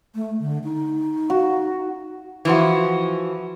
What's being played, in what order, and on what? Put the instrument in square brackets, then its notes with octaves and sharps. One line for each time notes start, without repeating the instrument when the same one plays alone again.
[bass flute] A3
D3
D#4
[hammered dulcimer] F#4
[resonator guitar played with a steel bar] E3 F3 F#4